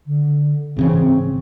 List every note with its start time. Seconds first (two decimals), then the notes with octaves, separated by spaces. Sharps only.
0.06 D3
0.77 G#1 C#3 E3 C4